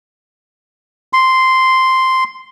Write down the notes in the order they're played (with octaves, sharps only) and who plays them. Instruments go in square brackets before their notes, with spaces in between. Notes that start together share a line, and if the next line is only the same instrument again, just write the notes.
[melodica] C6